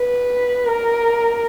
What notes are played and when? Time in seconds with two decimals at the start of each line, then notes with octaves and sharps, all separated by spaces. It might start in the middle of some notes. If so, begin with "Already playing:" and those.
Already playing: B4
0.66 A#4